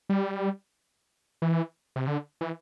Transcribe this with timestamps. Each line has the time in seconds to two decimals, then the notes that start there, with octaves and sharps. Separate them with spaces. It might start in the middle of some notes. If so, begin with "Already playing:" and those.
0.09 G3
1.42 E3
1.96 C3
2.07 D3
2.41 E3